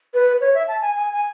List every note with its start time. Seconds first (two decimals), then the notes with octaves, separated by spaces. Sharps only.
0.14 B4
0.41 C#5
0.54 E5
0.68 A5
0.81 G#5
0.95 G#5
1.13 G#5